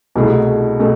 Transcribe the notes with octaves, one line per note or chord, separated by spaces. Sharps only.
C2 B2 A3 E4 G#4
B2 A3